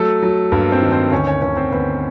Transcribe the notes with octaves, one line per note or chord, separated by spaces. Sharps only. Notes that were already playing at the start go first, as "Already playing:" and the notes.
Already playing: F#3 A3 A4
F#3
G2 A#3 A#4
C4 C5
D#3
C4 C5
D2 C#4 C#5
C#4 C#5
D2 C#4 C#5
C4 C5
D2 B3 B4